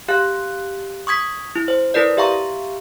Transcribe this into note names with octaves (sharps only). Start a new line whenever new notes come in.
G4 F5 F#6
C#6 D#6 G#6 B6
E4
C5
E4 A#4 B4 D5
G4 E5 F5 A#5 C#6